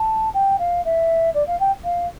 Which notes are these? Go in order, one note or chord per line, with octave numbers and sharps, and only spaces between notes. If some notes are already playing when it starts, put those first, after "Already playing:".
Already playing: A5
G5
F5
E5
D5
F5
G5
F5